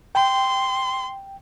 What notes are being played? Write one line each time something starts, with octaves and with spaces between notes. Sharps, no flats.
G5 C6